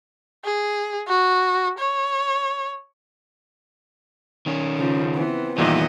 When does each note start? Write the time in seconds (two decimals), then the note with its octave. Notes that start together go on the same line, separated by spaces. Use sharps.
0.44 G#4
1.08 F#4
1.78 C#5
4.46 D#3 C#4
4.78 C#3 F3
5.16 E3 B3 C4
5.58 E2 A#2 D#3 E3 G3 D#5 E5 F#5